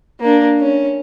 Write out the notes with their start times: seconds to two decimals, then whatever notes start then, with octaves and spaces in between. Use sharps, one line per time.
0.20 A#3 D4
0.60 C#4